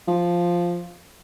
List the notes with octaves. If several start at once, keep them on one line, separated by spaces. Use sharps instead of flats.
F3